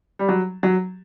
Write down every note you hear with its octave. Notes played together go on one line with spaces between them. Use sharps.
G3
F#3
F#3